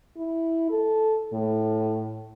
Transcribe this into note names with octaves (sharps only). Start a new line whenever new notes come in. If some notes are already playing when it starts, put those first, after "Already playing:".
E4
A4
A2